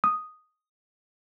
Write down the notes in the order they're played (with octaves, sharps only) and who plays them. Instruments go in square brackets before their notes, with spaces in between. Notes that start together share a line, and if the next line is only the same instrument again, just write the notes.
[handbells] D#6